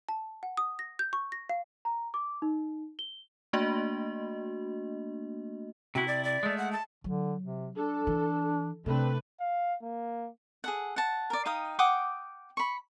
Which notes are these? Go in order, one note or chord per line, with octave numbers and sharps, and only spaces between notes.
A5
F#5
D#6
A#6
G6
C#6
A#6
F5
A#5
D6
D#4
G7
A3 A#3 D4 F#4 D#5
C3 E4 F#4
D5
D5
G#3 A3
F#5
A5
D3 F#3
C3
D4 A4
E3
C3 A3 C4 D4 B4
F5
A#3
G#4 A4 F#5
F#5 A5
A#4 D5
D#4 F5 G5 D#6
F#5 G5 D6 D#6
B5 C#6